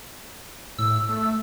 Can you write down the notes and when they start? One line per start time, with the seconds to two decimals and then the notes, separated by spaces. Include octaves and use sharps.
0.78 A2 E6
1.09 A3